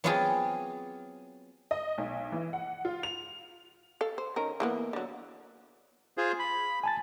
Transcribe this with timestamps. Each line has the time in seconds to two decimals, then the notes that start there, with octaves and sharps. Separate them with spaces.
0.04 F#3 B3 C4 F4 G4 G#4
1.71 D#5
1.98 B1
2.32 E3
2.53 F#5
2.85 F4
3.03 F7
4.01 A4 F5
4.18 C5
4.36 D#3 C#4 A#4
4.60 E3 A#3 B3
4.93 D3 F#3
6.17 F4 G#4 C5
6.39 B5
6.83 G#5 A5 A6